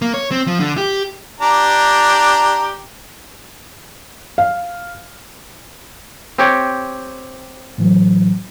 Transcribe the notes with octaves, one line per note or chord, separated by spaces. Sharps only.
A#3
C#5
C4
F3
D3
G4
D4 G4 A#5
F5
C4 G4 C#5
A2 E3 F#3